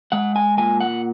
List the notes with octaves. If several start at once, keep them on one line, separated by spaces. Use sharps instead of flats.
G#3 F#5
G#5
A#2 G#5
F#5